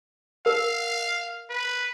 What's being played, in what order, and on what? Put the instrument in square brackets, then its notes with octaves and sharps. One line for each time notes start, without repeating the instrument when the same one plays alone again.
[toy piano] A#4 [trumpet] F5
[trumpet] B4